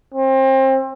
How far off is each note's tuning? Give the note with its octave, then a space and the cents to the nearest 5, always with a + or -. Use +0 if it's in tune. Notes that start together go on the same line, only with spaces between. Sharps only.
C4 +30